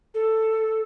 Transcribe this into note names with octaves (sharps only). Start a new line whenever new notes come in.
A4